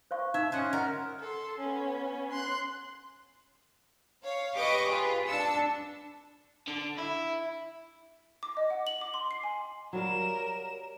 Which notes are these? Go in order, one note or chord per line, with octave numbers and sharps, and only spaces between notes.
C5 F5 C#6
D#4 E5
C#4 C5 D#5 F#5 F#6 G#6
A#4 D#5 F#5 F6
A4 C6
B3 C#4
C6 F#6
C#5 F5
G4 B4 D#5 C#6 D6
F4 G#4 B4
D4 A5 E6 C#7
D3
E4
D6
D#5
F#5
F#7
D6
C6
C7
G#5
F#3 G3 A#4 F5 E7